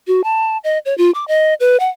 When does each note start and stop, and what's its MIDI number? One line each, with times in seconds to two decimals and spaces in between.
0.07 0.24 66
0.24 0.58 81
0.64 0.79 75
0.85 0.96 73
0.98 1.11 65
1.15 1.25 86
1.28 1.54 75
1.60 1.77 71
1.80 1.90 78